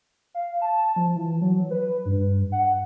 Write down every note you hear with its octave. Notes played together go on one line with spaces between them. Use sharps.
F5
A5
F3
E3
F#3
B4
G2
F#5